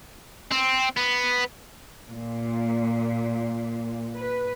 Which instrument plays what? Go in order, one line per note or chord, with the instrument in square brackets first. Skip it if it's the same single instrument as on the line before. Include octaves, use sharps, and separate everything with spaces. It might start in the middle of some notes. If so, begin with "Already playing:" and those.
[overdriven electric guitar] C4
B3
[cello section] A#2
B4